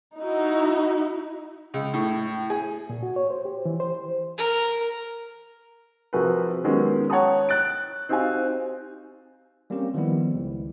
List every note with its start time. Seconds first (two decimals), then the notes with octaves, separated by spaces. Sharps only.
0.19 D#4 E4 F#4
1.74 C#2
1.94 A2
2.50 G#4
2.90 A#2
3.03 F#4
3.16 C#5
3.30 C5
3.45 G4
3.65 E3
3.80 C5
4.38 A#4
6.13 C3 F3 F#4 G#4 A#4 B4
6.64 D#3 F#3 G#3 B3 C#4 G4
7.10 C#5 F#5 G5 A5 A#5 D#6
7.49 F#6 A6 D7
8.09 C4 D#4 F#4 G4 F5 G#5
9.70 G3 A#3 C4 C#4 G4
9.94 D#3 F3 G3 B3 E4
10.34 C#2